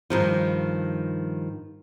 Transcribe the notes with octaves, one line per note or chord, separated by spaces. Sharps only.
G2 D#3 F3